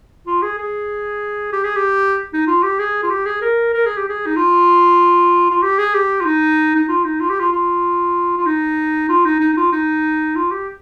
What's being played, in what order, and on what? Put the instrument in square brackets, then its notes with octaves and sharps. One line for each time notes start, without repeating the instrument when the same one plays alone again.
[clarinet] F4
G#4
G#4
G4
G#4
G4
D#4
F4
G4
G#4
F4
G4
G#4
A#4
A#4
G#4
G4
G#4
D#4
F4
F4
G4
G#4
G4
F4
D#4
D#4
F4
D#4
F4
G4
F4
F4
F4
D#4
F4
D#4
D#4
D#4
F4
D#4
F4
G4